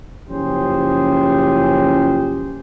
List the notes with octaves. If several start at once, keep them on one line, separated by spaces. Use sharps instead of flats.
F#1 F3 C#4 G4 G#4 C5